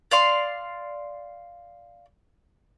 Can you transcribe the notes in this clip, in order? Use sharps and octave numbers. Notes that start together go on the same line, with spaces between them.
D5 F5 C6